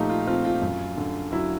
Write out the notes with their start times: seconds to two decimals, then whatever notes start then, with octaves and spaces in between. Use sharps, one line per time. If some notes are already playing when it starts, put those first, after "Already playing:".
Already playing: A#2 F3 A3 D#4 G4
0.09 F4
0.27 C4 F4
0.45 F4
0.62 F#2
0.97 D3
1.32 F#3 E4